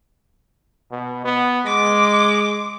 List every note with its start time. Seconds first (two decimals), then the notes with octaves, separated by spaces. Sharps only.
0.91 B2
1.25 B3
1.66 G#3 D6